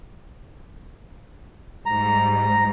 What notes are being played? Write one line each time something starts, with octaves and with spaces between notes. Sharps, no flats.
G#2 G3 A#5